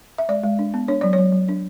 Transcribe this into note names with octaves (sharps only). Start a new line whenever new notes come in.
E5
G#3 D5
G#3
D4
B3
D4 C#5
F#3 D5
C#5
F#3
F#3
D4